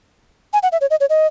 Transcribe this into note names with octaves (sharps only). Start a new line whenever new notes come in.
G#5
F#5
E5
C#5
D#5
C#5
D#5